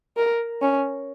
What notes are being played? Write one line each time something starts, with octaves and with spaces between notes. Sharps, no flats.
A#4
C#4